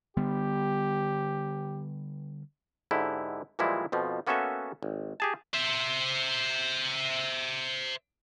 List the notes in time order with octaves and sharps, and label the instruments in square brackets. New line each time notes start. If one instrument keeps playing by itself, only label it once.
[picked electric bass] D3 G3 B3 [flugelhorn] G4
[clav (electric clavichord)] G#2 D3 E4 G4
A#2 E3 F3 G3 G#3 E4
F2 B2 F3
A#3 B3 C#4 F#4 A4 E5
G#1
G4 G#4 A5
[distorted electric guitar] C5 E5